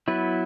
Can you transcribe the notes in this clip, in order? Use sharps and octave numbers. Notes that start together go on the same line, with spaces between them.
F#3 B3 E4 B4